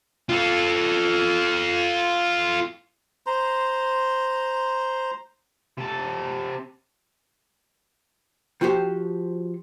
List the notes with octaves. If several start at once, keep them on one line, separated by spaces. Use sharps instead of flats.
F4 A4
C5 A#5 C6
C3 A5
F3 F#4 G4 C5